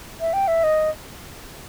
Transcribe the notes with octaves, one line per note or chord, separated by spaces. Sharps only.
E5
G5
E5
D#5